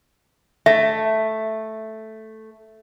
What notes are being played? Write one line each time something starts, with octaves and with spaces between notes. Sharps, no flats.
A3 E5